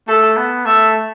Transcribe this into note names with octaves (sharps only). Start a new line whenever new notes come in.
A3 A4
B3
A3 E5